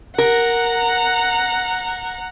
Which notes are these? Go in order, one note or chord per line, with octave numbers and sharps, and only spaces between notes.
A#4 F#5 A#5